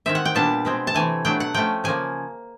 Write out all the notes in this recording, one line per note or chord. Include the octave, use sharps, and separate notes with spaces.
D#3 G#3 C4 E5
F#5
G5
A#2 G3 B3 D4 A5
B2 G#3 C4
A5
C3 E3 A3 G#5
B2 F#3 A3 D4 G5
F#5
F3 A3 C#4 G5
C#3 F3 A#3 G#5